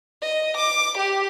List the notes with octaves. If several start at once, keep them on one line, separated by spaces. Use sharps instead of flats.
D#5
D6
G4